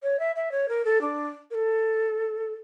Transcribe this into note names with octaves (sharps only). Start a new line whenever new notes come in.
C#5
E5
E5
C#5
A#4
A4
D4
A#4
A4